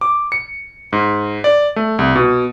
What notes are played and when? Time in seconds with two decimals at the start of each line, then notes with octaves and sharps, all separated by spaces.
0.01 D6
0.32 C#7
0.93 G#2
1.44 D5
1.76 A3
1.99 C2
2.15 B2